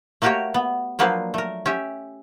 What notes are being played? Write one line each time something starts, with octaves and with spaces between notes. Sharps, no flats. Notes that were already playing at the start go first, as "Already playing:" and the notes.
A3 A#3 F#4 G4 A#4 C#5
B3
F3 F#3 A#3 D4 B4 C5
A3 A#4
C#4 G4 E5